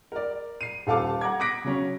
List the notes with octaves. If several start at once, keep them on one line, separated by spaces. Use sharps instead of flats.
A#4 D5
C7 D#7
D#1 A4 F5 A5 D6
F#5 A#5 D6 G#6
D6 D#6 F#6 A#6 B6 D7
C#3 F#3 C#4